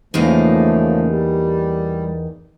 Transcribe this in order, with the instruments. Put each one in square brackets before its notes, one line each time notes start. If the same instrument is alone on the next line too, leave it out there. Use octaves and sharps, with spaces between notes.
[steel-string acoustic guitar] E2 A#3 D#4 [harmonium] C#3 F3 A3
[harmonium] G3